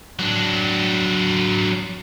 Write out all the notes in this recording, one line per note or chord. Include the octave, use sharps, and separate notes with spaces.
F#3 D4